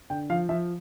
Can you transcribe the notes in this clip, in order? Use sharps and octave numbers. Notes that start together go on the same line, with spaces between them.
D3 G5
F3 F5
F3 E5